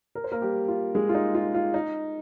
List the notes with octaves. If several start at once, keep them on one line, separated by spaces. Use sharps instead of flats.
A#4
C5
A#3 A#4
G3 G4
F4
G#3 G#4
F4
D#4
F4
F4
D#4